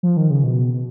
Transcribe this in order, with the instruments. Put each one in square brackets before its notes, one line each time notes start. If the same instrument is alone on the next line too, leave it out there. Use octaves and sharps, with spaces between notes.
[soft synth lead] F3
D#3
C#3
B2
B2